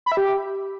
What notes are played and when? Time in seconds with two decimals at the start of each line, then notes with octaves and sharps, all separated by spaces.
0.06 B5
0.12 E5
0.17 G4